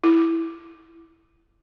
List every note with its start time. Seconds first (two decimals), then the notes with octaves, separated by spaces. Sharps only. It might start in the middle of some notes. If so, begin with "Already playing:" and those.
0.04 E4